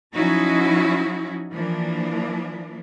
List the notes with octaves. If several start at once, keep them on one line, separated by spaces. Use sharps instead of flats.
F3 F#3 C#4 D#4 E4 F#4
E3 F3 A#3 D4